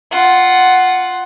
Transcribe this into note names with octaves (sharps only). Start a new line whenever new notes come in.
F4 F#5